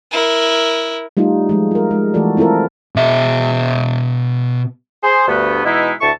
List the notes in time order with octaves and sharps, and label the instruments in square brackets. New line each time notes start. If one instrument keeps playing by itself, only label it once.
[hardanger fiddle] E4 A#4
[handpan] G3 A3 D#4 F4
F3 G#3
F4 A#4
G#3
E3 A3 F#4 A4 D5
C4 E4 F4 A4 A#4
[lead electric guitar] B2 E5
[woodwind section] G#4 C5
D2 G2 A3 B3
B2 E3 G#3 D#4 E4
D2 A2 E5 A5 C#6